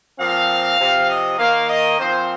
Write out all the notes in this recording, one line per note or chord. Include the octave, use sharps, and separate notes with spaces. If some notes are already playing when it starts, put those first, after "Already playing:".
A#2 F3 C4 F5
C3 F3 C4
D#5
D#3 A#3 F5
D#5
A#2 F3 C4 C5